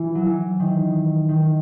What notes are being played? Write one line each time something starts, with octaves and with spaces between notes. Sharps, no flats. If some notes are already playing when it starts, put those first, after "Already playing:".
Already playing: E3
F#3
E3
D#3
D#3